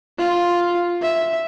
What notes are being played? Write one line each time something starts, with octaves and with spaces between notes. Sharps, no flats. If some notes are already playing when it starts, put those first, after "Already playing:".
F4
E5